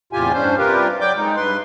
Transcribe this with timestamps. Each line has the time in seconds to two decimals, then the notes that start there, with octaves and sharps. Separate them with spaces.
0.13 E2 A2 C3 F4 G4 G#5
0.33 G2 C#4 D4 C5
0.58 C3 G3 F4 G4 A#4 B4
1.00 F#3 D5 G5 D6 G6
1.16 G#3 D#4
1.36 G2 B4 C6